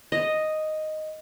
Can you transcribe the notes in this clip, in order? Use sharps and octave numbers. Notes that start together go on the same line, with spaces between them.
D#5